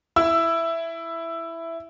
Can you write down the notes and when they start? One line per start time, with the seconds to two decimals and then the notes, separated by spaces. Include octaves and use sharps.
0.16 E4 E6